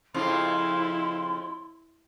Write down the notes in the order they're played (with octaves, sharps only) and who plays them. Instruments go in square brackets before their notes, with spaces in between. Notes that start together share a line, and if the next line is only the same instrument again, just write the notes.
[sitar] F2 C#3 F3 [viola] E4 [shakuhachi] C6